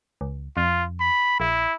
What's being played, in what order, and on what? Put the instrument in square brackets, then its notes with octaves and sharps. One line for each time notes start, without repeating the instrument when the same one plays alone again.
[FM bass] C#2
[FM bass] F2 [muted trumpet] F4
[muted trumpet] B5
[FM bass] A#1 [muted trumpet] E4